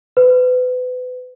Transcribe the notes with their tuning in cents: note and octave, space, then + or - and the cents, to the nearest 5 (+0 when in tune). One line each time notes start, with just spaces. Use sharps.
B4 +30